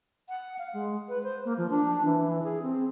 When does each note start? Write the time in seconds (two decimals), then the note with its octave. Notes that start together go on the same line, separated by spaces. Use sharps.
0.29 F#5
0.59 F5
0.74 G#3
1.09 B4
1.23 C5
1.45 A#3
1.58 F3
1.70 D4
2.05 E3
2.43 G#4
2.62 C4